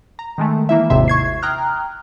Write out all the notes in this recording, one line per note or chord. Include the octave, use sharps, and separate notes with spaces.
A#5
D#3 G#3 A3
E3 A#3 E4 E5
G#1 D#2 G#2 C3 E5 C6
C#6 G#6 C7
G5 A#5 D#6 F6 F#6